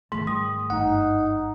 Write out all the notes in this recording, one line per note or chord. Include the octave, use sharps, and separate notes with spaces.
G#2 D#3 A3
G3 D#6
G1 D#4 F#5